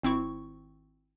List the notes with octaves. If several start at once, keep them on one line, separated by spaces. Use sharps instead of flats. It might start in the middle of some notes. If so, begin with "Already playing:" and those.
G#1 C4 E4 C#6